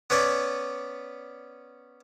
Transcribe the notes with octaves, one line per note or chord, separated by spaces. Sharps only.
B3 C#4 B4 D5